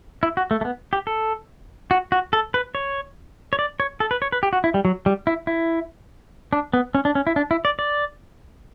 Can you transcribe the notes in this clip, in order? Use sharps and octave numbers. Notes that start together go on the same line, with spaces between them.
E4
F#4
A3
A3
B3
G4
A4
F#4
F#4
A4
B4
C#5
C#5
D5
C#5
A4
B4
C#5
B4
G4
F#4
E4
G3
F#3
G3
E4
E4
D4
B3
C#4
D4
C#4
E4
D4
E4
D5
D5